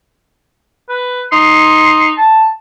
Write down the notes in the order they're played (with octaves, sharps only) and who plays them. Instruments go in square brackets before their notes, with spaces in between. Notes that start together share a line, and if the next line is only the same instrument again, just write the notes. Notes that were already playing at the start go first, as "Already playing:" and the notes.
[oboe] B4
[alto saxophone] D#4 [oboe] C6
[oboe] A5